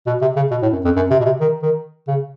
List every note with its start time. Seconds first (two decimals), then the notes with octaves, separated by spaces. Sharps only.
0.07 B2
0.22 C3
0.36 C#3
0.51 B2
0.62 A2
0.73 F#2
0.85 F2
0.96 F#2
1.11 C3
1.20 B2
1.25 C3
1.40 D#3
1.63 D#3
2.08 C#3